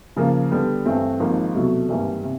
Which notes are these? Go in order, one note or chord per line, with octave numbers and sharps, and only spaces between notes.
C#3 F3 A#3
D3 G3 B3
G2 E3 A3 C4
G#1 G#2 F3 A#3
C2 B2 F#3 A3
G#1 G2 E3 G3 A#3
C3